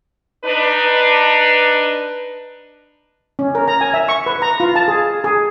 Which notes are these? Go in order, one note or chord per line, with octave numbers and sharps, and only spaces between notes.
D4 D#4 B4
C#4
A#4
A#5
G#5
E5
C#6
B4
A#5
F4
A5
G#4
G#4